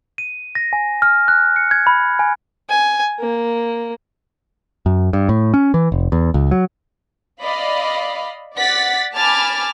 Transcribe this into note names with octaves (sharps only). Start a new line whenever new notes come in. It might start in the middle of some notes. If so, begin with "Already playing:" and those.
D#7
A#6
G#5
F6
F#6
C#7
G#6
B5
G#5
G#5
A#3
F#2
G2
A2
C#4
E3
F1
E2
C#2
F#3
D5 D#5 F5 B5
D5 F#5 A6 B6
G#5 A5 B5 D6 F6 A6